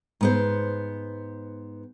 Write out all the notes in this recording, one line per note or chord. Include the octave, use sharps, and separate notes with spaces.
G#2 B3 C5